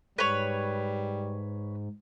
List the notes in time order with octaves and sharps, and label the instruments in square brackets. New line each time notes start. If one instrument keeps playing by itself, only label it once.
[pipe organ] G#2 [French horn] G3 [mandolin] B4 C#5